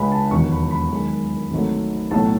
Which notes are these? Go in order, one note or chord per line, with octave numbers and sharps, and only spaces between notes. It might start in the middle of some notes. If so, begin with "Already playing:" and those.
Already playing: C#2 C#3 G#3 B5
A5
E1 D#2 D#3 F#3 C#6
B5
B5
F#2 D#3 G#3
G#1 G#2 F#3 A3
B1 A2 F#3 A3 A5